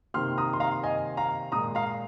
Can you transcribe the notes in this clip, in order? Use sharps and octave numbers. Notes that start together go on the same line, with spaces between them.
C3 D#3 A#3 C6 F6
A#5 D#6
C6
F5 A#5
D#5 G#5
F5 A#5
A#2 G#3 A#5 D#6
F5 A#5